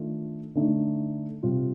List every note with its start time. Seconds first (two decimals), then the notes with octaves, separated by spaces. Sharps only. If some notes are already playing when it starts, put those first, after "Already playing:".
Already playing: D#3 A3 D4 F4
0.55 D3 A3 D#4
1.43 C3 G3 C4 F4